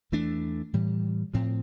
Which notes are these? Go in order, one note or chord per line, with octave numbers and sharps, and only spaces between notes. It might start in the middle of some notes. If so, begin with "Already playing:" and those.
E2 E3 A3 D4
A2 E3 G3
A2 F3 C4